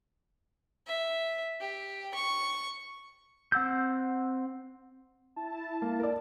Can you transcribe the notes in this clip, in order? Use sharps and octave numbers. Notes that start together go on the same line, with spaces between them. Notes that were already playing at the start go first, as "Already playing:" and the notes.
E5
G4
C#6
C4 F#5 E6 G6
E4 A5
A#3
A#4 D5